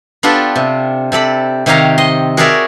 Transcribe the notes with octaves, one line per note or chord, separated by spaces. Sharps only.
B3 D4 F4 G4 A4
C3
C3 A4 D5 B5
C3 D#3 G4 C#5 F5 A#5
D#5 C6
F#4 G#4 A#4 C#5 D5 E5